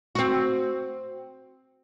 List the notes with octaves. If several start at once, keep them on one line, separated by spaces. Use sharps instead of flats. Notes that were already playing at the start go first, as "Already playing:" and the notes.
C4 F#4